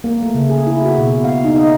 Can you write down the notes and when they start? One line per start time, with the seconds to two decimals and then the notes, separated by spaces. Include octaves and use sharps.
0.04 A#3
0.23 A3
0.35 C#3
0.50 G#4
0.67 E4
0.82 F#4
0.98 B2
1.24 F5
1.44 D#4
1.57 D#5